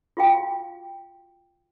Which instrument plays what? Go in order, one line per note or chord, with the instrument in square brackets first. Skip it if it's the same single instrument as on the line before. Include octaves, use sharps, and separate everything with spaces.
[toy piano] F4 F#4 F5 G5